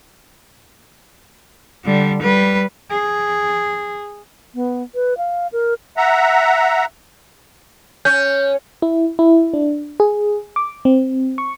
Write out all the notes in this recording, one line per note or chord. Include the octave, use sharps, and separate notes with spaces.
D3 G3
G3 B4
G#4
B3
B4
F5
A#4
E5 F#5 A#5
C#4 G6
E4
E4
D4
G#4
D6
C4
C#6